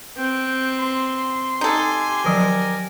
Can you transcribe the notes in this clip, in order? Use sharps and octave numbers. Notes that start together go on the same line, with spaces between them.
C4 G5
C6
D#4 G4 A4 G#5
D#3 F3 F#3 A#4